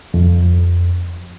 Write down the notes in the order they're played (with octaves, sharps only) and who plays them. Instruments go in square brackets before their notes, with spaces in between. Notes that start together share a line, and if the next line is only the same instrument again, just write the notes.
[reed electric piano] F2